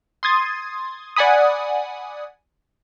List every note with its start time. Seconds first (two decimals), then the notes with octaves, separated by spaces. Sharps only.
0.23 C6 D#6 G#6 A6
1.16 D5 F#5 G#5 B5 D#6